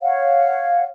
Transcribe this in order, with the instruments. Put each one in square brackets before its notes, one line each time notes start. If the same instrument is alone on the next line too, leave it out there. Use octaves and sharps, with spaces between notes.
[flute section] C#5 F5 F#5